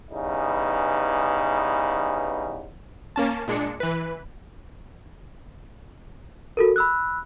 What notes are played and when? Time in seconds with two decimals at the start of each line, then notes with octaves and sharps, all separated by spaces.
0.11 C#3 E3 G3 B3 D#4
3.16 A#3 C#4 A5
3.48 A#2 G#3 D4 C#7
3.80 E3 B4
6.57 F#4 A4 A#4
6.76 B5 E6 F#6